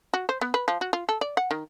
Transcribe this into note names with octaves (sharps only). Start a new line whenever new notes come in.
F#4
C5
B3
B4
F3
F#4
F4
A4
D5
F#5
D#3